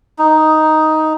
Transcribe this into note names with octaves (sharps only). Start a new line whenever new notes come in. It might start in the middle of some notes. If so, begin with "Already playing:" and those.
D#4